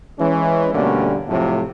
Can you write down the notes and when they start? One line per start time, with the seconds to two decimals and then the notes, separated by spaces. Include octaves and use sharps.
0.19 E3 G#3 C#4
0.73 B2 D3 G3 A3 A#3 C#4
1.28 A2 C3 F3 F#3 A3